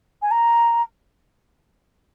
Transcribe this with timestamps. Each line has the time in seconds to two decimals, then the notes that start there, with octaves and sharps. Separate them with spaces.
0.22 G#5
0.31 A#5